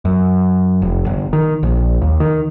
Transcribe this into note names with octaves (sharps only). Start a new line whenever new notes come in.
F#2
F1
G1
D#3
A#1
D#2
D#3